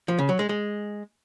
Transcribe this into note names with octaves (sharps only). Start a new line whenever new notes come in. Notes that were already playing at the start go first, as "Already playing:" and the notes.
F3
C#3
F#3
G#3
G#3